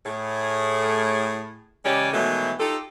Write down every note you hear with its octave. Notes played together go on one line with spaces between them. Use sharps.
A2 G#4
C#3 E3 G#3 C#4 G4 D5
B2 D#3 E3 F#3 G#3 A3
D#4 F4 G4 A4